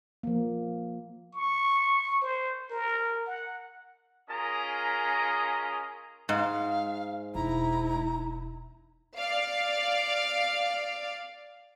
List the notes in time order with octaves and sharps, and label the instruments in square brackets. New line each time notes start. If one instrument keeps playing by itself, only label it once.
[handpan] F3 A#3
[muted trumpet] C#6
C5
A#4
F#5
[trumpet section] C#4 F4 G#4 A#4 D#5 A#5
[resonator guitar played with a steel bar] G#2 [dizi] F5
[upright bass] E1 [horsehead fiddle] D#4 E4 [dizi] A#5
[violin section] D5 F5